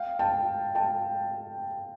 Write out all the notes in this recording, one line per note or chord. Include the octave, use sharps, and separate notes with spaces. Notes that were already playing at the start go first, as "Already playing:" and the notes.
Already playing: F5 G5
G5 A5
G5 A5